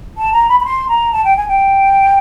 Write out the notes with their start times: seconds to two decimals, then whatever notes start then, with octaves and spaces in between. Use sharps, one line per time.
0.17 A5
0.33 A#5
0.49 B5
0.60 B5
0.65 C6
0.89 A#5
1.12 A5
1.24 G5
1.37 G#5
1.48 G5